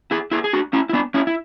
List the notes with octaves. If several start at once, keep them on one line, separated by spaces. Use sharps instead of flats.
E4 G#4
E4 G#4
G#4
D4 F#4
C#4 E4
E4
B3 D4
C#4 E4
E4